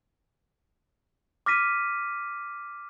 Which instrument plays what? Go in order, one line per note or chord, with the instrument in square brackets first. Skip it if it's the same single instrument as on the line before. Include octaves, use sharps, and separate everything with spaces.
[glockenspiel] D6 F6 A#6 B6 D#7